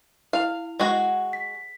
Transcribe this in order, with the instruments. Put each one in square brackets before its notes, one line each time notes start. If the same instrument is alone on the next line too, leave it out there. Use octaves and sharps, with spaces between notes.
[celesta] E4 F7 [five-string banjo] F5
[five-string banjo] G#3 F#4
[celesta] B6